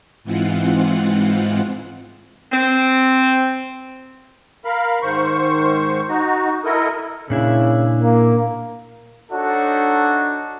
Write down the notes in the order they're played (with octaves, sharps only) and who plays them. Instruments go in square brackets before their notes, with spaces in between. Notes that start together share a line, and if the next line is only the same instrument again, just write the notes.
[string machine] G#2 E3 G#3 C4 F4 F#5
[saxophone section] C4
[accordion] A#4 F5 B5
G#2 D#3 C5 C#6
D#4 F#4
E4 A4 A#4 D#5
[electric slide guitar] A#2 D4 E4 [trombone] C#3
[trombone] A#3
[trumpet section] D4 D#4 F#4 A4 C#5